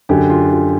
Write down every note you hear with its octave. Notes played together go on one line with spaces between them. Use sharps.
F#2 D3 G4
F4
F4